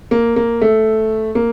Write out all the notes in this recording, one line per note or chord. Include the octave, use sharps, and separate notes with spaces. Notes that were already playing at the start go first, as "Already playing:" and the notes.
A#3
A#3
A3
A#3